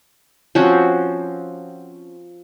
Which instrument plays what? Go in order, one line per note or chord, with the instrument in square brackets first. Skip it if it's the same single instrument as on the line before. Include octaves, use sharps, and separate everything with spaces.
[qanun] F3 C4 C#4 F#4